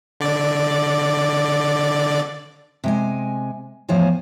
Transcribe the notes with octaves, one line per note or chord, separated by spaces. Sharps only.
D3 D5
C3 G#3 G#5
E2 A2 F3 C5 C#5 G#5